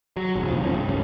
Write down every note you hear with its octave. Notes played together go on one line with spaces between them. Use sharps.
F#3
E1 A#1
F#1 D#2 B2 F3
F1 A2 F3 C#4
G2
C#2 G#2 C#4